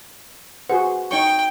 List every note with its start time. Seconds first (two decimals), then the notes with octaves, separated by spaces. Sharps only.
0.70 F#4 G#4 B4 C5 F#5
1.11 D#4 C#5 G5 C#6